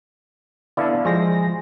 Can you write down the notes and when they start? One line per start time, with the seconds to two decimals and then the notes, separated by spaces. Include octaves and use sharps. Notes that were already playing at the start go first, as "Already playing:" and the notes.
0.77 D3 B3 E4 D5 F5 A5
1.05 F3 G#3 C5 A#6